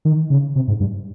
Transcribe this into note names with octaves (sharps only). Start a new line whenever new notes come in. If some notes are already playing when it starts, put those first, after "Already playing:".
D#3
C#3
C3
G#2
G2